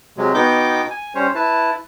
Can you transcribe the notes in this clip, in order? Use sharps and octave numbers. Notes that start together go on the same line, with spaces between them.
C3 F#3 G#3
B2 B3 D#4 G5 D6 G6
G#5
G3 C#4 C5 C#5
E4 B4 A5